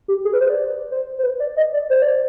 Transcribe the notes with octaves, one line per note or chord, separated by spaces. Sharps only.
G4
G#4
B4
C5
D5
C5
C5
B4
D5
D#5
D5
C5
D5